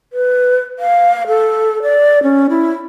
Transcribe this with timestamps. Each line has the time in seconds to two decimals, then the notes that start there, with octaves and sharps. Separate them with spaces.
0.13 B4
0.79 F5
1.27 A4
1.82 D5
2.23 C#4
2.50 E4